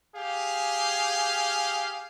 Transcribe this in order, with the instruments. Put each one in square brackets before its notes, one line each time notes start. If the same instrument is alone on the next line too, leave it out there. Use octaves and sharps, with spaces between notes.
[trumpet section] G4 G#4 F5